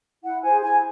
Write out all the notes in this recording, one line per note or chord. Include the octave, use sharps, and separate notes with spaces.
E4 F#5
G#4 C5 G#5
E4 G#5